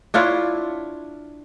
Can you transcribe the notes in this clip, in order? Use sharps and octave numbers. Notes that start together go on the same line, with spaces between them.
D4 E4 F4 C#5